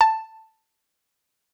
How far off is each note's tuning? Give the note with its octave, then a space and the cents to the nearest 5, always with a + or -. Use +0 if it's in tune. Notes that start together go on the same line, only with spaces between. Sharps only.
A5 +10